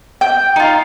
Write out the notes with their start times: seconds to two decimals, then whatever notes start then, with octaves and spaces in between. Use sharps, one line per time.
0.21 G5
0.56 D#4 F4